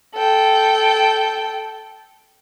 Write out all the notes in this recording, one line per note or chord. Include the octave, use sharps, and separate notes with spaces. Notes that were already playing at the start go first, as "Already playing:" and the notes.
A4 G5